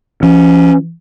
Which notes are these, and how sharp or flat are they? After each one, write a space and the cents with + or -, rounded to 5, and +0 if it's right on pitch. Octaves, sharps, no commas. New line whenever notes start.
F3 -45 C#4 +0